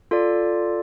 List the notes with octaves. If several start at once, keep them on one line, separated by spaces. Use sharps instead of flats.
F4 A4 D5